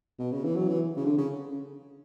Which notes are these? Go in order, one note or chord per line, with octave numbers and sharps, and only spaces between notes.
B2
C#3
E3
F#3
E3
C#3
D3
C#3